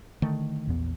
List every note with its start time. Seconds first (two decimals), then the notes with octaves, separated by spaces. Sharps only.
0.22 D3 D#3 A3
0.67 A#1 E2 B3